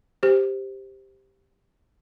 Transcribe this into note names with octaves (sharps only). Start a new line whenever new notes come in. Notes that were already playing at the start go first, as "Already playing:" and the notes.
G4 C5